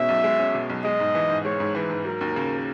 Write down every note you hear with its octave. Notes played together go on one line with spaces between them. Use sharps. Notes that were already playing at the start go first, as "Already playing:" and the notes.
Already playing: B2 G#3 C#4 E5
B1
G#3
C#4
B2
B1
G#3 D#5
G#2
E3
G#2
G#3 C#5
G#2
E3 B4
G#2
F#3 A#4
D#2
C#3